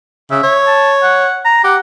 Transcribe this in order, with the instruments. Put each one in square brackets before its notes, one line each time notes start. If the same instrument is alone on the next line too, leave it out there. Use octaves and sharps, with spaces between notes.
[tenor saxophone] C#3 [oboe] E5
[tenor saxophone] C#5
[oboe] A5
F#5
A#5
[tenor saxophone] G4 [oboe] F#5